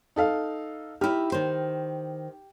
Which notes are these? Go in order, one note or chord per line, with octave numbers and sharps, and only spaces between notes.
D#4 A4 F5
D#4 E4 G4 F6
D#3 C5